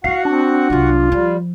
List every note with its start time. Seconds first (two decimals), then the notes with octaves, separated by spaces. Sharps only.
0.04 D#4 E4 F#4 F5 F#5
0.25 C4 D4
0.70 C2 F#3 F4
1.12 F3 G3